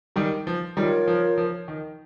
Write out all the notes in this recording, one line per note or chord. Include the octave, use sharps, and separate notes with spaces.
D#3 G3
F3
D#3 G3 F4 A#4 C#5
F3
F3
D#3